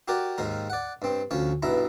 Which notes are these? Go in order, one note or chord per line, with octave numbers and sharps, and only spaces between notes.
F#4 G4 A#4 D5
D#2 G#2 D#3 A#4
D5 F#5
G2 C4
D2 F3 C#4 C#5
B1 G2 B2 E4 A#5